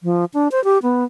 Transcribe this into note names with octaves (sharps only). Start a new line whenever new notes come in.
F3
D4
C5
G4
B3